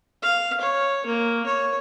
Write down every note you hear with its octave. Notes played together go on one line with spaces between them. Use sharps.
F5
C#5
A#3
C#5